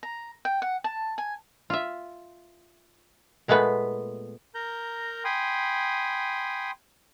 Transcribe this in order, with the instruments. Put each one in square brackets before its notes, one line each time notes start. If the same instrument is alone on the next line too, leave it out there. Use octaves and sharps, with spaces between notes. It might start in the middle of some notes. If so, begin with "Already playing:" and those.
[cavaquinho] A#5
G5
F#5
A5
G#5
[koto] F4 E5
A#2 G#3 A3 B3 B4
[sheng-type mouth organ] A#4 A#5 G6
G5 G#5 B5 C6 D#6